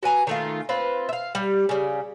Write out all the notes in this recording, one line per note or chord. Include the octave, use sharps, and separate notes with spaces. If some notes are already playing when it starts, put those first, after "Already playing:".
F#4 B4 G#5 A#5
D#3 A3 F4
C4 F4 B4
E5 F5
G3
C#3 G3